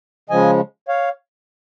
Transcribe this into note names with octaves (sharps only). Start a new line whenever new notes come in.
C#3 F3 G#3 D#5 G#5
C#5 F5